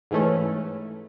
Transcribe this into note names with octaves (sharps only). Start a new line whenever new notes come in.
G#2 E3 A3 C#4